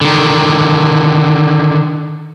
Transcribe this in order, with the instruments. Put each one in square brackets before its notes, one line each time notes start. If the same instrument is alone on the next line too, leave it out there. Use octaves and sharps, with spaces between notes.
[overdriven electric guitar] D3 D#3